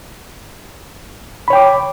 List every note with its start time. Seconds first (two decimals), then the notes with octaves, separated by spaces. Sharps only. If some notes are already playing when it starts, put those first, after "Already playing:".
1.48 B5
1.50 C#5
1.53 G5
1.55 D6